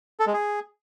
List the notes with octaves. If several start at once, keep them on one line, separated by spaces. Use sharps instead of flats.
A4
G#3
G#4